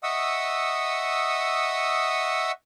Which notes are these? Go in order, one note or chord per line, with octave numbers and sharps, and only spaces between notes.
D#5 E5 F#5 C#6 D#6 E6